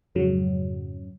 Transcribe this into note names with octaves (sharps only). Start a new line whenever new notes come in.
F2 G#2 C#3 F#3